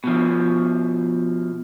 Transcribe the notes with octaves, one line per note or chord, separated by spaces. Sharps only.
B2 F3